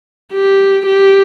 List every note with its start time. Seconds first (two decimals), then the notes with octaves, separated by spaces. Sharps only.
0.33 G4
0.86 G4